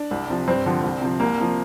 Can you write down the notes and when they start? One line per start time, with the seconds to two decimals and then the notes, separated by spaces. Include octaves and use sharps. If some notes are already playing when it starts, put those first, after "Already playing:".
Already playing: D4
0.11 C2
0.30 C3 F3
0.47 G2 C4
0.66 D3 F3
0.84 C2
1.02 C3 F3
1.20 C2 A#3
1.38 C3 F3